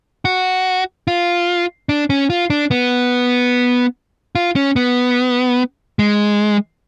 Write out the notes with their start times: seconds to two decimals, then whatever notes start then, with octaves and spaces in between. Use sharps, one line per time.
0.25 F#4
1.07 F4
1.89 D4
2.10 C#4
2.30 F4
2.50 D4
2.71 B3
4.35 F4
4.56 C#4
4.76 B3
5.99 G#3